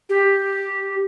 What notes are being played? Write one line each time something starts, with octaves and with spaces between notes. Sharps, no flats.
G4